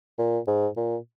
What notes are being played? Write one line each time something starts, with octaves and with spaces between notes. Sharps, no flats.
A#2
G#2
A#2